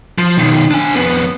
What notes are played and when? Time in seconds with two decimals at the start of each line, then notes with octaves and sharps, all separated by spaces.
0.18 F3
0.38 B2 D#3
0.71 D4 G#5
0.95 F2 B3